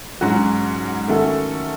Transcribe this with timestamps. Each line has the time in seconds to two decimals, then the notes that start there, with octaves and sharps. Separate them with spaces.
0.21 G#2 F#3 C#4 F#4
1.08 D#3 A3 C#4 F#4 A4